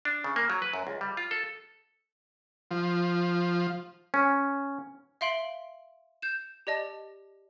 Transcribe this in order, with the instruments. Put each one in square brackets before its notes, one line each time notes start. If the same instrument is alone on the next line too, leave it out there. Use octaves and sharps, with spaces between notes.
[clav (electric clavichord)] D4
C#3
A#3
F#3
B4
F#2
C#2
G3
F4
A4
[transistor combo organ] F3
[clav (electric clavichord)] C#4
[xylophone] E5 F5 C6 D7 F#7
G6 E7
G4 D5 D#5 A5